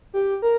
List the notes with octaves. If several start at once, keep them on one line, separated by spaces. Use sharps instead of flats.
G4
A#4